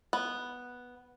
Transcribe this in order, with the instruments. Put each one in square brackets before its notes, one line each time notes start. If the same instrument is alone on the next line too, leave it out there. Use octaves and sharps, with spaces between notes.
[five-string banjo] B3